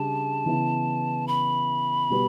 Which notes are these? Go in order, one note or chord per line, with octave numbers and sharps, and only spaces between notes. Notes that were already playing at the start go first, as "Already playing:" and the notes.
Already playing: C#3 G3 D4 A5
C#3 E3 B3 E4
B5
B2 G3 B3